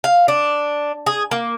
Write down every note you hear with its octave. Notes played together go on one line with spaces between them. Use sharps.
F5
D4
G#4
A#3